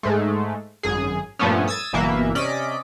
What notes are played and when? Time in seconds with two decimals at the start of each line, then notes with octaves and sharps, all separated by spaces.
0.03 G#2 G#3 A3
0.83 G#1 F#2 G#4
1.39 G2 A#2 F3 A3 B3 C#4
1.68 D#6 E6 G#6 A6
1.93 G1 B2 E3 A#3 E5
2.35 C3 C#4 D5 D#5 B6 D7